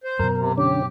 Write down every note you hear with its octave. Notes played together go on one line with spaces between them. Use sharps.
C5
F#2 B2 A#4
C3
D3 C#4 G4